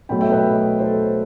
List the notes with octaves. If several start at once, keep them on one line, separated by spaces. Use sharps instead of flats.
B2 F#3 A3 G5 B5
E5 G5
B4 D#5
A4 C5